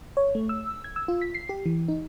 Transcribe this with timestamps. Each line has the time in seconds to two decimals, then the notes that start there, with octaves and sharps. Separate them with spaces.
0.17 C#5
0.35 A3
0.49 E6
0.84 G#6
0.96 E6
1.08 F4
1.21 B6
1.35 C7
1.49 G4
1.66 E3
1.88 D#4